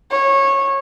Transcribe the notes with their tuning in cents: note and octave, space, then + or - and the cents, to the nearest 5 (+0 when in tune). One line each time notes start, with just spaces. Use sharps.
C#5 -20